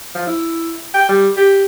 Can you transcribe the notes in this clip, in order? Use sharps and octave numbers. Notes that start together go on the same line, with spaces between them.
F3
E4
G5
G3
G4